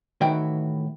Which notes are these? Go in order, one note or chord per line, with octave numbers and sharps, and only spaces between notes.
A2 D#3 E3 E4 F#4 G5